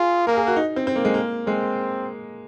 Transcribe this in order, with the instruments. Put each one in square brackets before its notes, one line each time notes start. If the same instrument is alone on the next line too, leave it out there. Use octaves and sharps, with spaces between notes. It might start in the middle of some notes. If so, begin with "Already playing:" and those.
Already playing: [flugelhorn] F4 [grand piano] G#4
[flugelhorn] A#3 [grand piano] A#4
[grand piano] G#4
F#4
D#4
C4
C4
A#3
G#3
A#3
[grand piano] G#3 [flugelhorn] C4